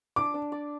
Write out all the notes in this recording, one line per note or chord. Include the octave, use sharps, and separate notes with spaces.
D4 D6
D4
D5